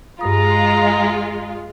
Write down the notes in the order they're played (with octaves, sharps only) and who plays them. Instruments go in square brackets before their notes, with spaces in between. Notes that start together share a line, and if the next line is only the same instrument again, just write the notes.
[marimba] G2 D#6 [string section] G#3 F4 [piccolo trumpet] A#5